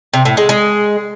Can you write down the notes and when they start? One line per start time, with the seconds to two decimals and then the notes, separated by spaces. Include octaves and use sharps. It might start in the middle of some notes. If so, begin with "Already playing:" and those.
0.14 C3
0.25 A2
0.37 G#3
0.49 G#3